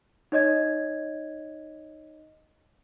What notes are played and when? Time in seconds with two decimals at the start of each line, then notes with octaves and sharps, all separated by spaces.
0.32 D#4 C#5 D#5 G#6